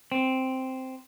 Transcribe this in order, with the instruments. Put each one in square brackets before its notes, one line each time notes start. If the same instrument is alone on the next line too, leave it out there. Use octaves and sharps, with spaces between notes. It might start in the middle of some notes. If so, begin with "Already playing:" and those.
[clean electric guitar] C4